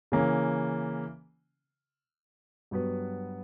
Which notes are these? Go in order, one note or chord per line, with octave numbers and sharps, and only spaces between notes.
C#3 E3 A#3 C#4
G2 F#3 B3 F#4 B4